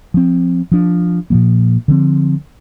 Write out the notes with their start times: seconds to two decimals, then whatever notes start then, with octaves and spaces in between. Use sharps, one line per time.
0.14 F3 C4
0.72 F3 D4
1.30 A#2 F3 A#3
1.88 D3 F3 C4